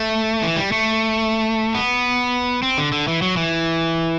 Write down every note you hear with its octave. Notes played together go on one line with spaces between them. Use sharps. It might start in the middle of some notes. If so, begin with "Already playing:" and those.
Already playing: A3
E3
G3
A3
B3
C4
D3
D3
E3
F#3
E3